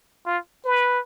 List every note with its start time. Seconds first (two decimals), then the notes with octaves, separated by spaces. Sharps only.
0.26 F4
0.65 B4